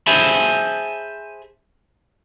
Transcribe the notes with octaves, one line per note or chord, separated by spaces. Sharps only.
G#4 C5 E5 G#5 A5 B5